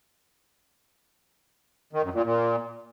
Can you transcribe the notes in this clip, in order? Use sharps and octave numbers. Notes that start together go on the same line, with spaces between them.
D#3
F#2
A#2
A#2